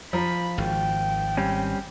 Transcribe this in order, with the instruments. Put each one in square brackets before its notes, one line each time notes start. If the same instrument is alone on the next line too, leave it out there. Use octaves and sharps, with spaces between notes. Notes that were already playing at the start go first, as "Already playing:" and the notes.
[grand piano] F3 A#5 [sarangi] B5
[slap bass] G#1 [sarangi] G5
[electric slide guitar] G3 C4 C#4